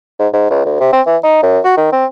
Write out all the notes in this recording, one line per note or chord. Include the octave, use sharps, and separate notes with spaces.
G#2
G#2
C#2
D2
C3
C4
E3
D#4
F#2
F#4
D#3
C4